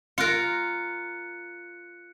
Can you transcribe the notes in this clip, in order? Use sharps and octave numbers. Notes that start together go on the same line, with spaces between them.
F4 A#4 F#6 C#7